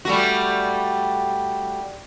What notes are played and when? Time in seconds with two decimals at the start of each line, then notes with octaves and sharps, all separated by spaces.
0.05 G3 A3 F#4